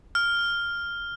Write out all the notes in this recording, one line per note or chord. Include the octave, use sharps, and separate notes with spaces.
F6